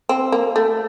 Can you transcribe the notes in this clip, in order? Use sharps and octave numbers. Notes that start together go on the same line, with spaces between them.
C4
A#3
A3